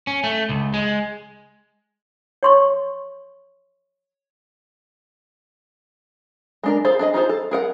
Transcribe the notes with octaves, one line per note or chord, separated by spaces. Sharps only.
C#4
A3
C#2
G#3
C#5 C6 C#6
G#3 D4 A#4
F4 G#4 A4 C5
D4 G#4 D#5
D#4 F4 G#4 C5
A4
G#4 A#4 F#5